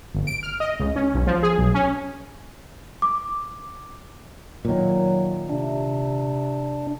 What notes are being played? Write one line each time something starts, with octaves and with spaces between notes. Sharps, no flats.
G1
D7
F6
D#5
C#2
C#4
B1
F3
G#4
B1
C#4
D6
A#2 D#3 F#3
C3 D4